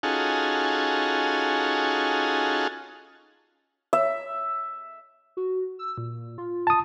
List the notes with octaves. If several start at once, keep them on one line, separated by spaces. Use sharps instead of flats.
C#4 D#4 F4 F#4 G#4 A4
E5
F#4
E6
A#2
F4
A5 D#6